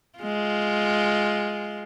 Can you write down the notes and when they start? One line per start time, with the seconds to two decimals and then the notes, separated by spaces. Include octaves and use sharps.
0.19 G#3 F4